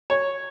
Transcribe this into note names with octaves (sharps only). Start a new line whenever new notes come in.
C#5